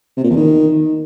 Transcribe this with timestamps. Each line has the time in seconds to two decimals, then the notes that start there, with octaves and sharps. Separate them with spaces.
0.17 C3
0.24 A#2
0.30 E2
0.37 D#3